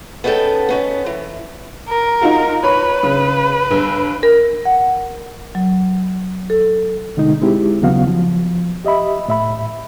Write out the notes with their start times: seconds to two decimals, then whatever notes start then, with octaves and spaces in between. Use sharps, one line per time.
0.24 B3 C#4 D#4 G#4 A4 G5
0.69 B3 C#4 D#4
1.06 E3
1.88 A#4
2.21 D#4 F4 F#4
2.63 B4 C#5 B5
3.03 C#3
3.70 G1
4.23 A#4
4.65 F#5
5.55 F#3
6.50 A4
7.17 B2 D3 G#3 D#4
7.42 G#3 C4 E4 G4
7.82 D#2 C#3 F#3 B3 F#4 F5
8.07 F3
8.85 G4 D#5 E5 B5
9.28 A2 E5 B5